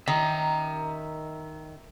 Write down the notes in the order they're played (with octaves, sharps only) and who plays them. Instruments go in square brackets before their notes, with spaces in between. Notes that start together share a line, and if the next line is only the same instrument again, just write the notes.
[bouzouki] D#3 [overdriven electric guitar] E5 A#5